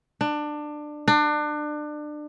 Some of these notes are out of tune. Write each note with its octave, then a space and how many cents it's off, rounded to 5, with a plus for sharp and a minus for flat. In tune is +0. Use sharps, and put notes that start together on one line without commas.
D4 +20
D4 +30